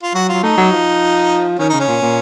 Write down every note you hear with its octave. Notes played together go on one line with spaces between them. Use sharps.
F4
F#3 F#4
F4
F#3
A3 D#4
F#3
F3
D#3 C#4
C#3 D#4
C#4
A#2
A#2